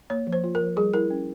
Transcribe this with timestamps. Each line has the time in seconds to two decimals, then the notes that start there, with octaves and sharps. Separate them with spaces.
0.10 A#3 C#5
0.27 F3
0.33 C5
0.44 F4
0.55 A#4
0.61 F3
0.76 G3 G#4
0.93 E4 A#4
1.10 C#4